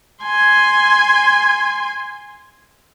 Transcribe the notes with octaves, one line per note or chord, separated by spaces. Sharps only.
G#5 C6